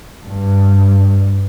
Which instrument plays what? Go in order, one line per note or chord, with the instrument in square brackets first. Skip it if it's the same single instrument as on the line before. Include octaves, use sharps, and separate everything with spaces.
[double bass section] G2